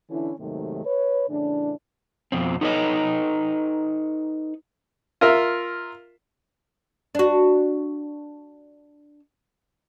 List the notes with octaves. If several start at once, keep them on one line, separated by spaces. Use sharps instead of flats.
D3 E3 C#4 D4 E4
D#2 G#2 C3 D#3 F#3 A3
B4 C#5
A2 C#3 E3 D4
F2 B2 C4
D#4 A4 B4 C#5 D#5
F4 A#4 E5
D4 F#4